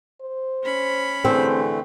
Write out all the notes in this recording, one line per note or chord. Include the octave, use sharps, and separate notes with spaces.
C5
C#4 B5
D3 E3 A3 C4 G#4